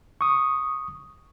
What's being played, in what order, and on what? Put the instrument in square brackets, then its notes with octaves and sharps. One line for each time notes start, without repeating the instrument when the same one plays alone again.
[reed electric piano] C#6 D#6